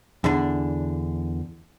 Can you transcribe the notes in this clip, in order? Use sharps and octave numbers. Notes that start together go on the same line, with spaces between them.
E2 D3 D4